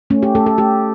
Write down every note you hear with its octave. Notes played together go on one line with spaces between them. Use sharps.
A3 C#4
G4
A3 A4
A4
A3 G4